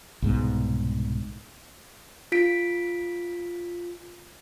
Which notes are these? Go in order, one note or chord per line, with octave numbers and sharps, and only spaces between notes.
C2 G#2 B2
F4 B6 D7